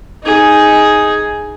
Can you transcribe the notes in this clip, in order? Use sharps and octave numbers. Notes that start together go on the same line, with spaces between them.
D#4 G#4